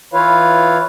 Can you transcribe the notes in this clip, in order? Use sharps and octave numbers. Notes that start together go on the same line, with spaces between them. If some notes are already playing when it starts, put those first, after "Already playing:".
E3 E4 F4 B4 C#5 F5